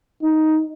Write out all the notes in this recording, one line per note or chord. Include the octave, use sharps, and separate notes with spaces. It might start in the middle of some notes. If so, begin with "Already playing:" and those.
D#4